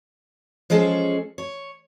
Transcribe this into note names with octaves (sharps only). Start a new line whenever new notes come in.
F3 G#3 C#4 G#4 A4
C#5